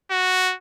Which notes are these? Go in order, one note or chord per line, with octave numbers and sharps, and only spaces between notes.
F#4